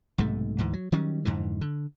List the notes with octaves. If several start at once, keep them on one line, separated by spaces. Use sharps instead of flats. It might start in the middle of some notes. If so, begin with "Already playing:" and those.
B1 G#2 C3 A3
D2 G#2 E3
F#3
D#3 F#3 G3 C#4
F2 G#2 D3 E3
D3